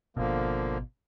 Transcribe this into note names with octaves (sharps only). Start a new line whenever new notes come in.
G#1 B2 D3 F3 A#3